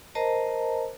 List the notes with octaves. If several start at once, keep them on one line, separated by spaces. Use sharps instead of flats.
A#4 C5 D#5 A5 A#5